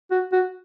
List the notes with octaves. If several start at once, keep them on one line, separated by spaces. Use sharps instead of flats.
F#4
F#4